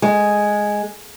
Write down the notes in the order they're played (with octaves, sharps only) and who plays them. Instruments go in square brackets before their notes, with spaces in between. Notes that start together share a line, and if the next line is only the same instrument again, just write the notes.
[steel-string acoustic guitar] G#3